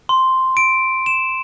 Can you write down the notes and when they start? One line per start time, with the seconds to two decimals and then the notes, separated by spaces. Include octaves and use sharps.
0.09 C6
0.57 D7
1.06 E7